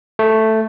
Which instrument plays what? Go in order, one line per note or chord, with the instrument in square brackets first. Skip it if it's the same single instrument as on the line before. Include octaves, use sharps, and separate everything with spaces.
[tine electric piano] A3